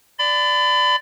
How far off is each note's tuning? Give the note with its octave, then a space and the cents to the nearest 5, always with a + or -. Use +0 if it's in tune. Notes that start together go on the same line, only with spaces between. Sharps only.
D5 +0 B5 +35